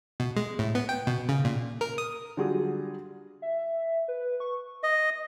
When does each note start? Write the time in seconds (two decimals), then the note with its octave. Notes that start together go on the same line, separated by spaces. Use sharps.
0.20 B2
0.37 G#3
0.59 A2
0.75 B3
0.89 G5
1.07 B2
1.29 C#3
1.45 A#2
1.81 A#4
1.98 D#6
2.37 D3 F#3 G3 F4 F#4 G#4
3.42 E5
4.08 B4
4.40 C#6
4.83 D#5